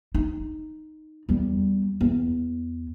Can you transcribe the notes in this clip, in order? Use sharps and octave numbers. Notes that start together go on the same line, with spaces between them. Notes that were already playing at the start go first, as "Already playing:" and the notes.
D#4
E2 G3
E2